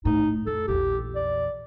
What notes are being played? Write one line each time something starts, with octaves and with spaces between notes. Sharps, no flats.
A2 D#4
F2 A4
A#1 E2 G4
D5